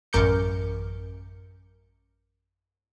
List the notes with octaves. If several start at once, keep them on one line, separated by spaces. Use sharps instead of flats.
A1 F#2 A#4 D6 G6 C#7